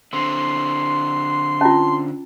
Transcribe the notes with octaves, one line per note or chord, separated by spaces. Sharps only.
D3 C4 C6
C#4 F4 A5